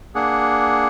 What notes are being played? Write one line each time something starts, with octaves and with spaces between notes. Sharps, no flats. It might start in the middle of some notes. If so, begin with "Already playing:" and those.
A#3 D4 G#4 F#5